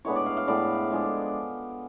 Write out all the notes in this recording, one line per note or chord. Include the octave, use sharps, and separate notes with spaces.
A2 G#3 B3 D4 C#5
D5
F5
F5
A2 G#3 B3 D4 D5
F3 G#3 D4